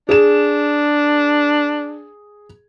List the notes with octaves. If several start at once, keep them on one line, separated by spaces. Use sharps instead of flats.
D4 G#4 E7